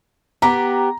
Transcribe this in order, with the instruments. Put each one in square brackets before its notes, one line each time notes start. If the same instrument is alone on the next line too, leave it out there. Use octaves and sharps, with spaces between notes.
[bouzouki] B3 G4 [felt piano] A#5